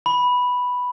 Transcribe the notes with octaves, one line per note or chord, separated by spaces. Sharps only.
B5